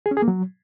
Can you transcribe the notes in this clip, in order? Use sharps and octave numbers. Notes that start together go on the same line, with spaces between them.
G#4
C#4
G#4
A#3
F#3